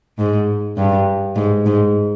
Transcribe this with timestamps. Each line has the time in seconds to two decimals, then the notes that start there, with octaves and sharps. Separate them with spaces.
0.18 G#2
0.77 G2
1.36 G#2
1.66 G#2